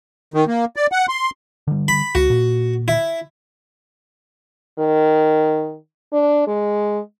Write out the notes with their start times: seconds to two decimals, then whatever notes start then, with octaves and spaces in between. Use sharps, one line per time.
0.34 D#3
0.48 A#3
0.76 D5
0.92 F#5
1.09 C6
1.67 D3 G3
1.88 B5
2.15 C#2 F#4
2.30 A#2
2.88 E4
4.78 D#3
6.12 D4
6.47 G#3